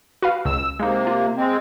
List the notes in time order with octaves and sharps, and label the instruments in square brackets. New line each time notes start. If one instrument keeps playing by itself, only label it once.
[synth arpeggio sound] F#4 B4 F5
[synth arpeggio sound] C#2 [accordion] E6
[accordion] C3 A#3 [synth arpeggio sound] G#3 D#4
[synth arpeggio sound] F4
[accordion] G#3 C4